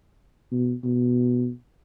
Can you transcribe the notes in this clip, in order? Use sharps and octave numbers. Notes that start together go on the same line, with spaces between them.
B2
B2